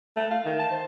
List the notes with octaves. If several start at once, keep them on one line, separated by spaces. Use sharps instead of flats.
A3
F5
D#3
A5
C5